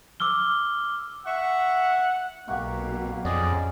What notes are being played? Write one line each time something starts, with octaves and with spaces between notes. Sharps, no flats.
D6 E6 F6 G7
E5 F#5 C#6
B1 B2 A#3 G4 F#5 C#6
F2 C#4 G#4 D5 D#5